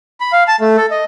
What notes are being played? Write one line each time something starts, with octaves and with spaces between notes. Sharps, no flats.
B5
F5
A5
A3
A4
D#5